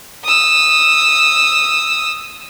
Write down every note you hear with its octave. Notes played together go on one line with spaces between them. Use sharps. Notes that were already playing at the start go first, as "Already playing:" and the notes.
D#6 E6